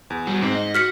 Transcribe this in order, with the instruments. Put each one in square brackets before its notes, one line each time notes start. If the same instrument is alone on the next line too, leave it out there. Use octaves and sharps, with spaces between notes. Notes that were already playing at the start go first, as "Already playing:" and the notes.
[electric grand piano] E2
[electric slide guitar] G3 F#4
[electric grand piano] G#2 [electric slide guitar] C4
[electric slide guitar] D#5
[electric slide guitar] F#4 [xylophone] F6 B6 C#7